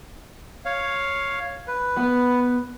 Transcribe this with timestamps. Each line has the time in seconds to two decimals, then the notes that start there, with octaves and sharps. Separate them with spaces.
0.65 C#5 F5
1.67 B4
1.97 B3